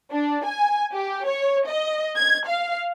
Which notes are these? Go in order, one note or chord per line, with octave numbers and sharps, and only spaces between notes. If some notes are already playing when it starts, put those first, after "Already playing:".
D4
G#5
G4
C#5
D#5
G#6
F5